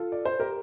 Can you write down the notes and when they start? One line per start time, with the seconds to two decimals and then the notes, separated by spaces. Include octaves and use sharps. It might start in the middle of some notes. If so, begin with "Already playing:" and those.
Already playing: F4 A4
0.12 D5
0.25 C5
0.40 G4 A#4